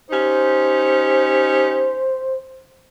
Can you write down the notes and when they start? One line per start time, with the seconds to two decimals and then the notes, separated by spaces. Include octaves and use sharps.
0.11 C#4 D#4 G4 C5